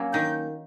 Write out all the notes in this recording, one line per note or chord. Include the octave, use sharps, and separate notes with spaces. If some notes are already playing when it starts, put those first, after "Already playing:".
Already playing: F#3 A#3 C#4
D#3 G6